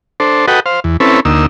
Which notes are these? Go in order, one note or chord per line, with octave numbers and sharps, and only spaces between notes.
D4 A4 C5
F#4 A4 B4 D#5 F#5 G5
C5 F5
E2
C4 C#4 E4 A4 B4
D2 A#3 D#4 E6